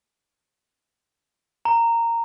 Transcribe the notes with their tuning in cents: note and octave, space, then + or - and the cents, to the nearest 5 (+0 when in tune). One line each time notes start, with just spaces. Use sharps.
A#5 -10